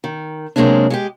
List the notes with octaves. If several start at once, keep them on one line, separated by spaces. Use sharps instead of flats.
D#3
C3 F#3 G#3 A#3 C#4 D4
G#3 F#4 G4